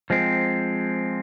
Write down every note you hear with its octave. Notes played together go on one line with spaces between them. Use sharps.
F3 G#3 C4